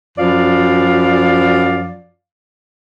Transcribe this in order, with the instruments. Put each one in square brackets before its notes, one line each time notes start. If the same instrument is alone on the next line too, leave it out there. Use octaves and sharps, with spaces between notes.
[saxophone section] F#2 F3 D5 F5